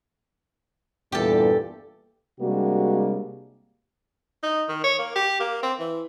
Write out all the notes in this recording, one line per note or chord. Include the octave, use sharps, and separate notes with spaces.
E2 G2 A#2 G4 A4
C3 G3 G#3 A#3 D4 F#4
D#4
D#3
C#5
A#3
G4
A#3
C4
E3